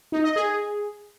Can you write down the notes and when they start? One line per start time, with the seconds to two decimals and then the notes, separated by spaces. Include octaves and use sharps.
0.12 D#4
0.24 D#5
0.36 G#4